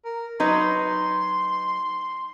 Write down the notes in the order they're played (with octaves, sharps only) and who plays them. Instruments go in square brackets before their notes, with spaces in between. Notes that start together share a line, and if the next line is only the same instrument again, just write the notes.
[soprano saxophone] A#4
[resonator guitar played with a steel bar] F#3 D#4 B4 [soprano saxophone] C6